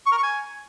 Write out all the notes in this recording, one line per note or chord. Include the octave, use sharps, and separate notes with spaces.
C#6
A#4
C#6
G#5